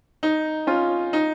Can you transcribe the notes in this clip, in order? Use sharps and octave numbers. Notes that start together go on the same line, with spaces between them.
D#4
C#4 F4
D#4